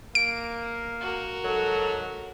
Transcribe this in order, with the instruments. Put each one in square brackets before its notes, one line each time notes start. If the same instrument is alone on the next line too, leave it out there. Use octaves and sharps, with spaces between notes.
[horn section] A#3 [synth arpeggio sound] D7
[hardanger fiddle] F#4 A#4
[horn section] G#2 F#3 [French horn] A4